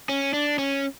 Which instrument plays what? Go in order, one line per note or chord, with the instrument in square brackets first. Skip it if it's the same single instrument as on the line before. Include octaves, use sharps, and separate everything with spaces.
[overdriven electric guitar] C#4
D4
C#4